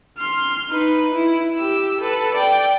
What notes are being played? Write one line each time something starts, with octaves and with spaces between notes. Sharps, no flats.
C6 F6
D#4 B4
E4
G4 E6
A4 B4
D5 G5